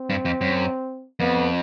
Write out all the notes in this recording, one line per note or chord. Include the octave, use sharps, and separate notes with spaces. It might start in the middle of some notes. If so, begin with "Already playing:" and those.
Already playing: C4
G2
F2
F#2
F2 B3